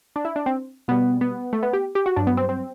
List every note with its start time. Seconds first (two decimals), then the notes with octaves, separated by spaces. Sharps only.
0.16 D4
0.25 E4
0.36 D4
0.46 C4
0.88 B2 G3 B3
1.21 B3
1.53 A3
1.63 B3
1.73 G4
1.95 G4
2.06 F#4
2.16 G2 F#3 D4
2.27 B3
2.37 C4
2.49 C4